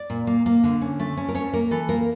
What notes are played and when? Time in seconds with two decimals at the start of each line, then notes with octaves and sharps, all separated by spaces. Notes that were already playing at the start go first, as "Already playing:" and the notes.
Already playing: D5
0.10 A#2
0.27 A#3
0.46 A#3
0.64 D3
0.81 C#4
1.00 A3
1.17 C#4
1.28 A#4
1.35 C#4 C#5
1.53 A#3 A#4
1.71 E3 A4
1.89 A#3 A#4